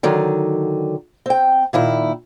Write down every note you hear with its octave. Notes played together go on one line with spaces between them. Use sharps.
D3 D#3 F#3
C4 G5
A#2 D#3 E4